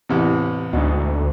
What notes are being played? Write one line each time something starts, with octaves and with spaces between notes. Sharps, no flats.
A1 E2 C3
D2 G#2 B2